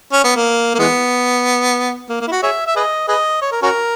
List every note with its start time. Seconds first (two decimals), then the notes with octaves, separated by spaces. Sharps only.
0.13 C#4
0.24 B3
0.36 A#3
0.75 A#3
0.79 E3 G#3 B3
2.10 A#3
2.21 A#3
2.28 E4
2.32 F#4
2.43 G#4 C#5 E5
2.67 E5
2.76 G#4 B4 D#5
3.08 G#4 B4 D#5
3.41 C#5
3.52 A#4
3.63 C#4 F#4 A#4